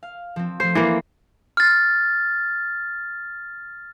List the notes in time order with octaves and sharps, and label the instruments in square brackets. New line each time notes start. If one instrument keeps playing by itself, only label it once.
[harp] F5
F3 C4
[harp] F3 A3 [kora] C5
[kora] E3 A#3
[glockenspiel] F6 A6